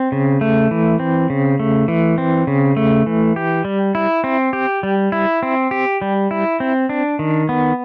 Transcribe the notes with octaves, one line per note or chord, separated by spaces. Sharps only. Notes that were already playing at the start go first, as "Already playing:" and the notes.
Already playing: C4
C#3
A3
E3
C4
C#3
A3
E3
C4
C#3
A3
E3
G4
G3
E4
C4
G4
G3
E4
C4
G4
G3
E4
C4
D4
D#3
B3